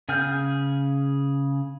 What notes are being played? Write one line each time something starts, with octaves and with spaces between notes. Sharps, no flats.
C#3 G#4 G#5 F6 G6